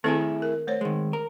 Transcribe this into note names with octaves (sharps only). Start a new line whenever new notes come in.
D#3 A3 C4 E4 G#4 A4
A#4
A3 C5 C#5
D#3 G#3
A#4